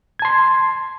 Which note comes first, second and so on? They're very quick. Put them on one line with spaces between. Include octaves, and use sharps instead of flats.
G#6 A5 C6